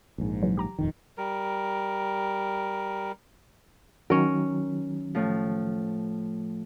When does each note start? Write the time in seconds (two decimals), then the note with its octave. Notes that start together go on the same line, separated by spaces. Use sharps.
0.18 A#1 G#2
0.42 C#3 E3 F#3
0.57 G4 A#5 D6
0.79 D#1 F2 D#3
1.18 G3 A#4
4.10 D#3 F#3 C#4 A#4
5.15 A2 F3